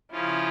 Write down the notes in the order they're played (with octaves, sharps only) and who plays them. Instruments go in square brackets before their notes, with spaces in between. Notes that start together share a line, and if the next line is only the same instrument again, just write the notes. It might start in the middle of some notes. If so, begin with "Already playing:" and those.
[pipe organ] C#3 F3 C#4 F4 [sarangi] E4